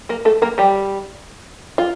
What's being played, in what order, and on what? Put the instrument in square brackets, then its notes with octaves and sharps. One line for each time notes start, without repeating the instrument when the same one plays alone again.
[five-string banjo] A#3 A#4
A3 A4
A#3 A#4
G3 G4
F4